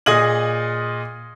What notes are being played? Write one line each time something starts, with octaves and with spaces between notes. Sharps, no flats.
A#2 G#4 D#5 D#6 G#6 F#7